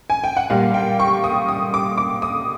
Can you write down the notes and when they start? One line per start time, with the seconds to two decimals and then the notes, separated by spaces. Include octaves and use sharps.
0.10 G#5
0.24 G5
0.37 F#5
0.50 A#2 G3 A#3 F5
0.74 G5
1.00 C#6
1.24 D#6
1.48 D#6
1.74 D6
1.97 D6
2.22 D#6